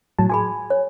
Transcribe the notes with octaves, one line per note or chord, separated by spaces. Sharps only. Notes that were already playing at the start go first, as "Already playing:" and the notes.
A2 F#3 A5
F#4 G#4 G#5 B5
C#5